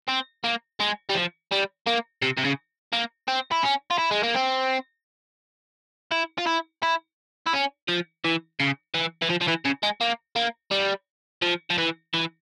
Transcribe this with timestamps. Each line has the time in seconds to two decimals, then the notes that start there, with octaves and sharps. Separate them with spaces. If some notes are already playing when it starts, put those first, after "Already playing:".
0.09 C4
0.44 A#3
0.80 G#3
1.10 G3
1.15 F3
1.51 G3
1.87 A#3
2.22 C3
2.38 C3
2.45 C#3
2.93 A#3
3.28 C4
3.52 E4
3.63 C#4
3.91 F4
3.98 E4
4.11 G#3
4.23 A#3
4.35 C4
6.12 E4
6.38 F4
6.47 E4
6.83 E4
7.47 E4
7.54 C#4
7.88 F3
8.24 E3
8.60 C#3
8.94 E3
9.22 E3
9.30 F3
9.42 F3
9.48 E3
9.65 C#3
9.83 G#3
10.01 A#3
10.36 A#3
10.71 G3
11.42 F3
11.70 F3
11.78 E3
12.14 E3